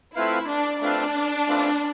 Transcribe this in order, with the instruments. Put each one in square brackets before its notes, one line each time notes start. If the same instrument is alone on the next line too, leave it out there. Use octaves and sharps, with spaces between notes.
[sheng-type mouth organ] A3 C4 F4 B4 F5 [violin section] E4
[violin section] D4
[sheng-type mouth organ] A3 C4 F4 B4 F5 [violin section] D4
[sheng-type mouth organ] A3 C4 F4 B4 F5